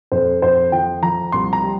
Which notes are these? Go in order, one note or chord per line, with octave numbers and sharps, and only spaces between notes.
F2 C5
F2 C5
F3 G5
F3 A#5
C2 C6
A#5
G3